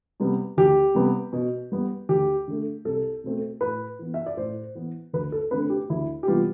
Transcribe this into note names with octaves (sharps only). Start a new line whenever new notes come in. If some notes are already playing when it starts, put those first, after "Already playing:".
C3 G3 B3
D2 G4
C3 G3 B3
B2
G3 B3
D2 G4
D3 A3
C2 A4
B2 A3 C4
A2 B4
E3 B3
E5
D5
A2 C5
E3 B3
D2 B4
A4
D3 A3 C4 B4
G4
D2 E4
G4
C3 E3 G3 B3 F4